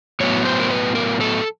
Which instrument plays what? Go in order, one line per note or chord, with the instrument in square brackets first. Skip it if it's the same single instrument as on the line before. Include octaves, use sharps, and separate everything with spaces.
[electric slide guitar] A2 F#3 B3 C#5
C5
A#4
B4
A#4
A4